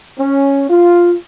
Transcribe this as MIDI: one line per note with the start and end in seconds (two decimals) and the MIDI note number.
0.19 0.66 61
0.70 1.14 65